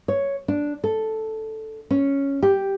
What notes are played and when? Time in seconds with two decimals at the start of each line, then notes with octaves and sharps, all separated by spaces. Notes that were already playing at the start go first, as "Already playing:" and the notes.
0.08 C#5
0.48 D4
0.84 A4
1.91 C#4
2.43 G4